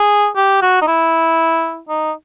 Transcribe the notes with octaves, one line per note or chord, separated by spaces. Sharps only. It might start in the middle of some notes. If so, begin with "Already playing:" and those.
Already playing: G#4
G4
F#4
D#4
E4
D#4